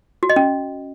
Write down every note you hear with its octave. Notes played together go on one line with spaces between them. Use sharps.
F#4
D#5
C#4